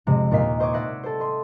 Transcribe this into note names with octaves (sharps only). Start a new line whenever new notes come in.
F2 C3 G#3
D#2 A#2 A#4 D#5 B6 C7
C5 D#5 C#6 D6 G#6
D5 E5 F#5 B5 A#6 C7
A4 C5
D#5 C6